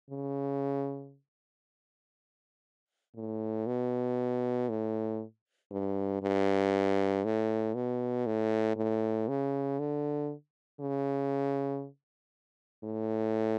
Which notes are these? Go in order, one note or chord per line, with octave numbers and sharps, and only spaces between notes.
C#3
A2
B2
A2
G2
G2
A2
B2
A2
A2
C#3
D3
C#3
A2